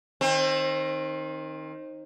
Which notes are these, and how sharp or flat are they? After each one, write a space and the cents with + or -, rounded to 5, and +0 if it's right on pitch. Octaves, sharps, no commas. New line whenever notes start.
D#3 +0 C4 +30